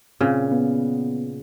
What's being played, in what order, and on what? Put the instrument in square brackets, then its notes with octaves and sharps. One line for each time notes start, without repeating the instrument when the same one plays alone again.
[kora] A#2 C#3 [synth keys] C4
[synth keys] B3